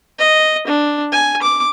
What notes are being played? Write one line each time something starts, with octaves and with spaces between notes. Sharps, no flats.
D#5
D4
G#5
D6